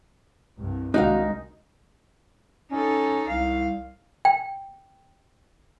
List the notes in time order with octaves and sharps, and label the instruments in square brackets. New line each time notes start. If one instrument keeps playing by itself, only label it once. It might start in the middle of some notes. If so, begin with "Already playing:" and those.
[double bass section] C2 G2
[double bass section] C2 D#3 G#3 [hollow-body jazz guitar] D4 F#4 F5 [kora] D#4
[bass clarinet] C#4 [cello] D#4 A4
[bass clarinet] C2 [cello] F5
[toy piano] G5